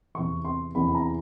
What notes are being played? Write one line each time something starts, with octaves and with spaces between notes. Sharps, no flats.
E2 C3 E3 C#6
C6
E2 C3 E3 B5
B5
A#5